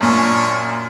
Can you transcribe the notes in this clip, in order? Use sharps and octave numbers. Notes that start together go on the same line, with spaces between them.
F#2 A#2 C#4 D4